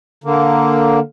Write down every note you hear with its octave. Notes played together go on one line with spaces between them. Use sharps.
D3 A#3